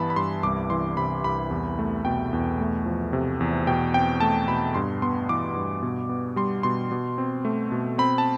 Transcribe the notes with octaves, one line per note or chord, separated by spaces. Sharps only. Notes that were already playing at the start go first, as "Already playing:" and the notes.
Already playing: G2 E3 B3 A5 B5
B5
G2 C6
C2 D6
E3 C6
C3 B5
C2 B5
E2
A3
B2 G5
E2
A3
F3
C3
E2
B2 G5
C4 G5
A3 A5
B2 B5
G2 C6
B3 C6
E3 D6
G2
B2
B3
G3 C6
B2 C6
B2
C4
A3
B2
C4 B5
A5